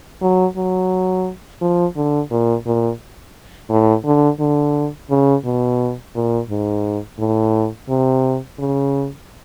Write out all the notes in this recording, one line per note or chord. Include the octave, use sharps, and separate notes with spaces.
F#3
F#3
F3
D3
A#2
A#2
A2
D3
D3
C#3
B2
A#2
G#2
A2
C3
C#3